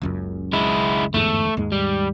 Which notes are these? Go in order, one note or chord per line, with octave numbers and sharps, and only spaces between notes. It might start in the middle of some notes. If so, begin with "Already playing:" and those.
F#1 C#2 F#2
G#3 E4
G1 E2 G#2 A3
D#2 G#2 G#3
G3